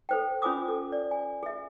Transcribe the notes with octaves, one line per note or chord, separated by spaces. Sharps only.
A4 C5 G5
C#4 F4 C5 G#5 D6 D#6
A4
D5
G#5
G#4 E5